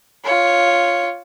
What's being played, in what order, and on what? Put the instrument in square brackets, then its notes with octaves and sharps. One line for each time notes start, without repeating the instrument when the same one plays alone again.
[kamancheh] F4 C#5